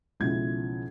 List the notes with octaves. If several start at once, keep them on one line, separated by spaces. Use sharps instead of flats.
B1 C#3 F3 G#3 E4 G#6